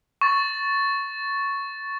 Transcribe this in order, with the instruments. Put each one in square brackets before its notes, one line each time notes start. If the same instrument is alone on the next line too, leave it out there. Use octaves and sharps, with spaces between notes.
[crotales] C#6 A6